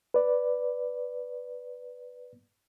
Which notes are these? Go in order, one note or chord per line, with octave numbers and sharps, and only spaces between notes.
B4 D5